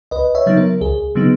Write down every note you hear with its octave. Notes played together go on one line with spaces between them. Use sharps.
C#2 B4 D#5
C#5 E5
C#3 F#3 B3 D#4
A#4
C#2 G#4
C#3 F#3 B3 D#4